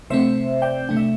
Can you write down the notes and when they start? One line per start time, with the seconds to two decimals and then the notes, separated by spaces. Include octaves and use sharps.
0.10 C3 A3 C4 C5 E5
0.62 D5 G5
0.89 C3 A3 D4 G5
0.97 E5